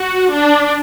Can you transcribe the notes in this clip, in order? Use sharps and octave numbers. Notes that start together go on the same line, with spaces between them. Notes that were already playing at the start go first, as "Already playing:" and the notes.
Already playing: F#4
D4